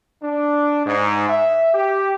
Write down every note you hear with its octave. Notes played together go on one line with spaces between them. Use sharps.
D4
G#2
E5
G4